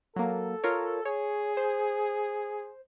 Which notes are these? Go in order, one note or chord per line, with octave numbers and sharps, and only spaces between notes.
F#3 A#3 A4
F4 A#4 C#5
G#4 C#5
C5